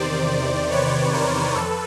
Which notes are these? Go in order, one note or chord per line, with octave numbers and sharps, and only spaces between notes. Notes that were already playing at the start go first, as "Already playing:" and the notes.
Already playing: E2 C3 D#3 C5 D5
B4 C#5
A#4 C5
F2 A4 B4